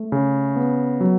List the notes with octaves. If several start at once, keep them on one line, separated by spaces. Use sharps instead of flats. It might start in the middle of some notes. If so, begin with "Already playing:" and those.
Already playing: A3
C#3
B3
F#3